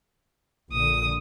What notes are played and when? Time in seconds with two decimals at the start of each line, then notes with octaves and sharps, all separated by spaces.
0.72 A#1 D3 D#6